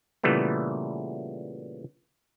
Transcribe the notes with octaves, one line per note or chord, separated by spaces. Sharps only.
A#2 C#3 E3 G3 A3 B3